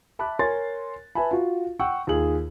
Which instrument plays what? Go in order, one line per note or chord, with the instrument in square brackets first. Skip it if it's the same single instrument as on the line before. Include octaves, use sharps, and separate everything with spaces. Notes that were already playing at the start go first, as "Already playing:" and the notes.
[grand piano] E5 A5 B5 D6 F#6
A#4 C#5 G#5 C6 A6
B4 E5 G#5 A5 B5
F4 F#4
F#5 G5 C#6 E6
D#2 F4 G#4 F#7